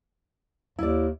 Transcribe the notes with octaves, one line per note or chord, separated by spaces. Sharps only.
D#2 E4 D5